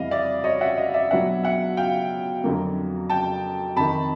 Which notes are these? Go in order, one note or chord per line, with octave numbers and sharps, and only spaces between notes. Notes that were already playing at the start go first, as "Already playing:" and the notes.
Already playing: F2 C3 E3 G3 D#5 F5
D5 E5
C#5 D#5
E5 F#5
D#5 F5
D5 E5
B2 F#3 B3 D4 E5 F#5
E5 F#5
F5 G5
F2 D3 F#3 A#3
G5 A5
F2 C3 D#3 A5 B5